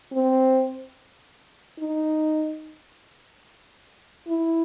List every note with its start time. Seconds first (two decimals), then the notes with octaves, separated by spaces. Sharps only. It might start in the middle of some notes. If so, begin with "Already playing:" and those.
0.13 C4
1.80 D#4
4.28 E4